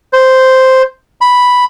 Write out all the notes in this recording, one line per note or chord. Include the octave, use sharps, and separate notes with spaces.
C5
B5